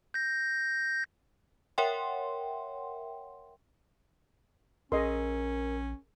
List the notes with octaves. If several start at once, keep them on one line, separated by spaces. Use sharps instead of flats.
G6 A#6
A#4 C#5 E5 F#5 G5 C6
A#1 C#4 G#4 A#4 D#5 C6